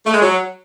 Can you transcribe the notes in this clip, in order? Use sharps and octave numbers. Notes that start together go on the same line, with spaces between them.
A3
G#3
F#3